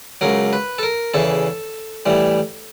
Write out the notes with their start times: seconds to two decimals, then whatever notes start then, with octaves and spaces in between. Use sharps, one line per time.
0.21 C#2 C#3 F#3 A#4
0.53 B4
0.78 A4
0.83 A#4
1.14 E2 C#3 E3 A4
2.06 A2 E3 G3